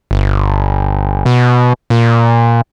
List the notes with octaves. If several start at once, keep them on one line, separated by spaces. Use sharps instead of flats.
G1
B2
A#2